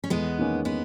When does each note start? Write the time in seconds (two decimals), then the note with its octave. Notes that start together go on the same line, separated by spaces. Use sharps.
0.04 C#4
0.10 E2 G#3 B3
0.38 D#3 A#3 C#4
0.65 G#3 B3